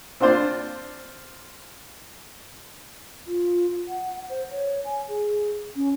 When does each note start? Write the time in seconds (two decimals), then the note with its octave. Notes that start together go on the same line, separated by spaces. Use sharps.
0.20 C4 D4 F4 C5 D5
3.27 F4
3.88 F#5
4.30 C5
4.51 C#5
4.85 G#5
5.08 G#4
5.76 C#4